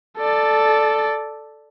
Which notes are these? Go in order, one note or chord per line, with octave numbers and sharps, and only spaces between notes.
A4 D5